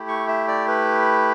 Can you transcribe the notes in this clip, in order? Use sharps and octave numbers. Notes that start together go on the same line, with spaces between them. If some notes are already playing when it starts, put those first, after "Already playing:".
Already playing: A3 E4 G4
C#6
E5
D5
B4